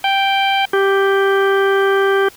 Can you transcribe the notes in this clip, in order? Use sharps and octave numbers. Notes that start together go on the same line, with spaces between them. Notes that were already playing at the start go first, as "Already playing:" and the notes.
G5
G4